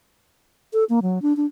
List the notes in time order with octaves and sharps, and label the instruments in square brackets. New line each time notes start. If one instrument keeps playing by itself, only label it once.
[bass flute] A4
A#3
F#3
D4
D4